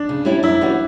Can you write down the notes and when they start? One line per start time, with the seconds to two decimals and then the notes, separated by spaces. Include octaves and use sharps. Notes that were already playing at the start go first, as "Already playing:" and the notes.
Already playing: D4
0.09 C#3
0.25 G3 C#4 E4 G4
0.43 F#2 E4
0.61 E3 G3 C#4 F#4